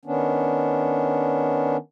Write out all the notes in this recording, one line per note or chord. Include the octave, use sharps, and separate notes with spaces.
D#3 B3 C#4 D4